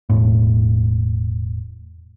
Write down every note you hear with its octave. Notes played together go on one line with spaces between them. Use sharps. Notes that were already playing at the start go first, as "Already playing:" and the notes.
E1 A2